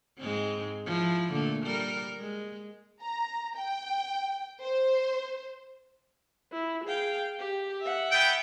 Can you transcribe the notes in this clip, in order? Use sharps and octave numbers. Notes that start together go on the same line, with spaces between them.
G#2 G#3 C4
F3 E4
A#2 D3 A3
G3 A#4
G#3
A#5
G5
C5
E4
G#4 F5 G5
G4
E5 F#5
B3 G5